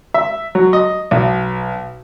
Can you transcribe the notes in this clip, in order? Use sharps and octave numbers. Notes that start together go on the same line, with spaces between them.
E5
F#3
D#5
B1